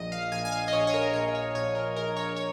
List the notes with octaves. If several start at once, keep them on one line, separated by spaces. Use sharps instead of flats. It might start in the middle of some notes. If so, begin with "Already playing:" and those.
Already playing: A#1 D#5
F5
A#1 G#5
G#5
F5
D#5
A#1 C#5
C#5
A#4
A#1 C#5
C#5
A#1 C#5
A#4
A#1 A#4
C#5
C#5